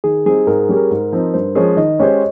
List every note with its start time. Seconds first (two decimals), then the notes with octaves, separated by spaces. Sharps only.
0.04 D#3 G#4
0.26 G3 C4 D#4 G#4
0.47 G#2 A#4
0.69 G3 C#4 G4
0.77 A#4
0.91 G#2
1.12 F3 C4 D#4
1.34 G2 C5
1.55 F3 G#3 C#4 G#4 C#5
1.77 D#3 D#5
2.00 G#3 C#4 G4 C5 C#5